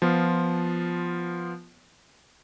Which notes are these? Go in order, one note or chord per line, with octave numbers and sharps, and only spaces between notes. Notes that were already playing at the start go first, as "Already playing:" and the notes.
F3 B3 F4